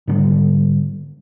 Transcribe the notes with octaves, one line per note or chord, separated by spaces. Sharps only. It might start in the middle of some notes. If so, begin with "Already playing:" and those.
G#2 D3 G3